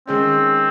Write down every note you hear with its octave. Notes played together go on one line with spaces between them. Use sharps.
D#3 G#3 C4 C#4